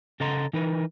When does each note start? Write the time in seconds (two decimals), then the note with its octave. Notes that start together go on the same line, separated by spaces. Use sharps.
0.20 C#3 A4 D#5 F#5 A#5 C6
0.53 E3 D#4 A#4 B4